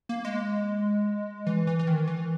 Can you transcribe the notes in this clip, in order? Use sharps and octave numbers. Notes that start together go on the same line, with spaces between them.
A#3
G#3
E3
E3
E3
D#3
E3